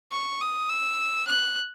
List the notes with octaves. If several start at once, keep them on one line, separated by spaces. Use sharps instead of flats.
C#6
D#6
E6
F#6